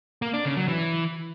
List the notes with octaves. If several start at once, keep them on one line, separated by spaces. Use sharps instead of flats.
A#3
D4
C#3
F#3
E3